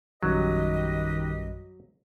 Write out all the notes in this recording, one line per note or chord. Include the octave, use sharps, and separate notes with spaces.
A#1 F#2 D#3 F#3 G3 G4 B4 D#5